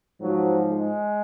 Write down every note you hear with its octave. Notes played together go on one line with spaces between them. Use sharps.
G#2 F3 F#3
G#3